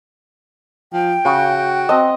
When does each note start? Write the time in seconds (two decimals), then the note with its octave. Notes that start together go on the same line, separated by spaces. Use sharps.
0.93 F3 G5
1.25 C#3 F#4
1.89 C4 D#5 A5